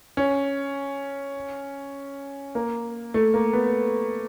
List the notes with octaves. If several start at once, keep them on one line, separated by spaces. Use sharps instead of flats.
C#4
A#3
A3
A#3
B3